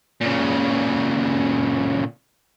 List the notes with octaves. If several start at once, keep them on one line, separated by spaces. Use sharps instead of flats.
A#2 C#3